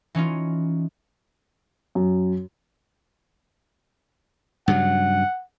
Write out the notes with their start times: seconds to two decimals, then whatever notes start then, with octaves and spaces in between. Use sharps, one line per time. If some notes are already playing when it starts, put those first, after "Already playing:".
0.15 E3 C#4 D#4 F4
1.95 F#2
4.68 G2 C#3 F#3 F#5